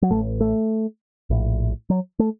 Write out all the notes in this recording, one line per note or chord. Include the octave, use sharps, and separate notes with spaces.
F#3
A1 A2 A3
A3
A#1 A2
F#3
A3